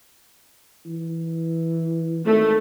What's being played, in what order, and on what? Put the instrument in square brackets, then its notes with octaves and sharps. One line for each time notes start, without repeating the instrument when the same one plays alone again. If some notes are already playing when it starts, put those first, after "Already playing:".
[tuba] E3
[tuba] G#1 [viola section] A3